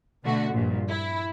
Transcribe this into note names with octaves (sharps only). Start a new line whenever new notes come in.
B2 D3 A3 F#4
A#1 G2 A#2
E4